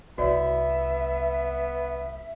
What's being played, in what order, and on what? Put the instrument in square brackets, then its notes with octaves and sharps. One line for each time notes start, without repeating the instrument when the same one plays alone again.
[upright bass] C2 [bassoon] B3 [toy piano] F#4 C#5 D5 [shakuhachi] E5